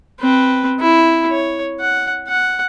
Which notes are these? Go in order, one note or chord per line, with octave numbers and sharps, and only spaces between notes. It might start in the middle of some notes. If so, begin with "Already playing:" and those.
C4 B4
E4
C#5
F#5
F#5